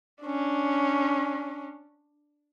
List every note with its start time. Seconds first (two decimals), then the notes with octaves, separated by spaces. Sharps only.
0.24 C#4 D4